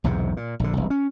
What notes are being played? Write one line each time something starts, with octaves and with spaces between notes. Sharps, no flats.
B1 E2 G#2 C3
A#2
A#1 D3
E1 C2
C#4